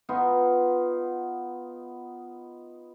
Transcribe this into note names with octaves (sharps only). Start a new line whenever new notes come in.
B3 D#4 F4 A#4